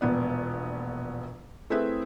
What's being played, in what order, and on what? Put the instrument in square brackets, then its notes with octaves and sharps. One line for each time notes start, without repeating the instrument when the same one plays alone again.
[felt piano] E1 A#1 B3 D5
A3 C4 E4 G#4 B4 E5